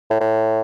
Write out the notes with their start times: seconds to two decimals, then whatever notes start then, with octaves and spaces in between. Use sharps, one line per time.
0.10 A2
0.21 A2